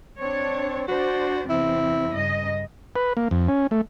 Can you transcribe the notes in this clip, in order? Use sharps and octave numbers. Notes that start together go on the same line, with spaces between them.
C4 D4 C#5
D4 F#4 C5 D5
E2 C3 C4 E4
G2 C#3 D#5
B4
A#3
F2
C#4
A3